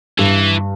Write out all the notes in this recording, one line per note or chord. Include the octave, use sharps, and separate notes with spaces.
G2 E3